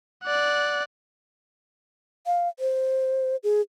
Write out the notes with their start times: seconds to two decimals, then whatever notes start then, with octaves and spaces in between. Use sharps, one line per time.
0.24 D5 F#5
2.26 F5
2.59 C5
3.44 G#4